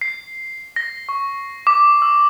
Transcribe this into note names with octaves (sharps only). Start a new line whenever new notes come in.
C7
A#6
C#6
D6
E6